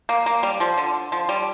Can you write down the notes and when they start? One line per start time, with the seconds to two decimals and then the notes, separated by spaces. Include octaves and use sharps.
0.09 A#3
0.26 A#3
0.43 G3
0.60 F3
0.77 D3
1.12 F3
1.29 G3